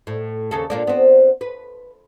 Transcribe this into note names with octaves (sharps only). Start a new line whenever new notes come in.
A2
D#2 C#3 A4
A#2 A#3 D4
B3 C4
B4